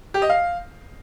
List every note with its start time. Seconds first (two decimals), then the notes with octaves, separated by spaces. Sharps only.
0.14 G4
0.22 D#5
0.30 F5